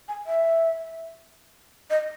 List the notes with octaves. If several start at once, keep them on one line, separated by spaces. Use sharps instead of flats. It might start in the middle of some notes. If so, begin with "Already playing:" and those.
G#5
E5
D#5